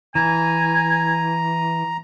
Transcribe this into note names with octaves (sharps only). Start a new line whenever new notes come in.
E3 G#5 A#5